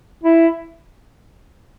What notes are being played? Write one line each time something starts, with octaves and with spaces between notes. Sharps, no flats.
E4